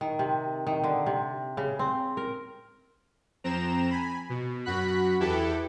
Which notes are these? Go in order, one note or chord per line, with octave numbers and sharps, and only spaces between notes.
D#3
C3
D#3
D3
C3
C#3
C4
A#4
F2 C4 A#5 E7
G#5 B5
B2
F#2 F#4 B5 F#6 B6
E2 E4 G4 A4 B4